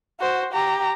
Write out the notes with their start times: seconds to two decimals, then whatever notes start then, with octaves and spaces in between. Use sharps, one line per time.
0.20 F#4 C5
0.53 G4 A#5